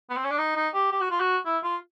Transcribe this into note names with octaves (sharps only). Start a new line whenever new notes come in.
B3
C4
C#4
D4
D#4
D#4
G4
G4
F#4
F4
F#4
E4
F4